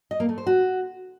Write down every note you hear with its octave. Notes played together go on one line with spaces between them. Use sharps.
D#5
A#3
A3
C5
F#4